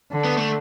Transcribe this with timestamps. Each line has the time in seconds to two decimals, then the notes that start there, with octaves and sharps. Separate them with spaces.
0.12 D3
0.24 B3
0.37 A3